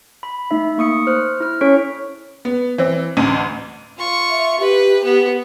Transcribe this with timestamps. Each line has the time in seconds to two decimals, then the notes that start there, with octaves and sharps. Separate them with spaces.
0.23 B5
0.51 A3 D#4 E5
0.78 A#3 C#6 D#6 C#7
1.07 C5 F6 F#6
1.40 E4 F6
1.61 C#4 A4 C#5 C#6 B6 D7
2.45 B3
2.78 E3 C4
3.17 A1 D2 D#7
3.98 F4 C#6
4.30 E5
4.60 G4 B4
5.04 B3